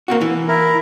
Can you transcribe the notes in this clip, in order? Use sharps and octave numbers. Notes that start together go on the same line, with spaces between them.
A#3 C4 F#4
E3
E4 A#4